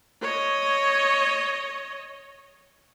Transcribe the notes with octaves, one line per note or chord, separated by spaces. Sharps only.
C#5 D#5